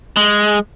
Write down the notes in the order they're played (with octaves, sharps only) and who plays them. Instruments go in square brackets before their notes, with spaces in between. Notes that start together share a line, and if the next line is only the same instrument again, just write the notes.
[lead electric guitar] G#3